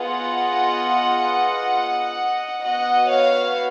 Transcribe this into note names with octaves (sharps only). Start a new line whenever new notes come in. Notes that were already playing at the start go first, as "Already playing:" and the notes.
Already playing: B3 F4 G#4 D#5 F#5
B3 F#4 D#5 F#5
C#5 F5